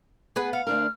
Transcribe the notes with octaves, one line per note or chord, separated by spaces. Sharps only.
B3 G#4 B4 F#5
F5 F#5
D2 D4 A#4 F6